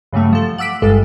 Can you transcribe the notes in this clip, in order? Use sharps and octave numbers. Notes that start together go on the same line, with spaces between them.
G2 C#3 F#3 G3 A3
F3 A4
F#5 D6 E6 B6 D7
G1 G2 G3 G#3 A4